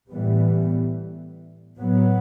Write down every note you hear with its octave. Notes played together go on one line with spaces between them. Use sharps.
A2 E3 G3 B3
A2 F#3 B3